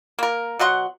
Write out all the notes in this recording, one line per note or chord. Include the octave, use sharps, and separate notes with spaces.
A#3 A#4
B2 F#3 F#5 C6